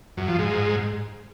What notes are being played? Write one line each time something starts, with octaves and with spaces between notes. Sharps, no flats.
F#2
F3
G#2